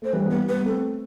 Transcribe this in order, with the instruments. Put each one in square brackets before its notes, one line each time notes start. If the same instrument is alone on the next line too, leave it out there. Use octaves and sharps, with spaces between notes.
[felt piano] A3 [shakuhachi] C5
[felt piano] E3 G3 [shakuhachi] B4
[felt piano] G3 B3 [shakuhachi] B4
[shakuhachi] B4
[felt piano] G3 B3
[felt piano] A3 C4 [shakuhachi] A4